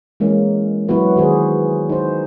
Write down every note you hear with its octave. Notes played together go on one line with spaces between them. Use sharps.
E3 G#3 A#3 C#4 A#4
F#3 B3 E4 F#4 B4
D#3 F#4 G#4 C5
D#4 C5